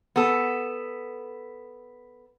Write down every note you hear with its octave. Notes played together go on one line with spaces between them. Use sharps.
B3 A4